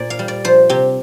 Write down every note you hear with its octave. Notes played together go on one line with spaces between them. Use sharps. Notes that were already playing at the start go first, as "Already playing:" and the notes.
Already playing: A#2 D5
F5
G3
D5
F3 C5
C3 G4